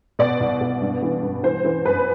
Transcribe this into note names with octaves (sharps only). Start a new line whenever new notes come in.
B2 D5
C2
B2
G2
E3
G2
E3 C5
E3
F#2 B4